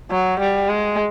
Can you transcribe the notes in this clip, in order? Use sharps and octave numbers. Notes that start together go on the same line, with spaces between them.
F#3
G3
G#3